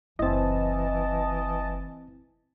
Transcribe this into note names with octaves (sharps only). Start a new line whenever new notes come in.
F#1 E3 C4 E4 D#5 A5